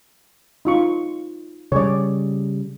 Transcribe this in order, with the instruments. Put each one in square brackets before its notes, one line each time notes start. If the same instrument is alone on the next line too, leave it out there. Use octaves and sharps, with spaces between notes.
[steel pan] D#4 F4 C#6
[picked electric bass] C#3 G3 [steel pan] C#5 D5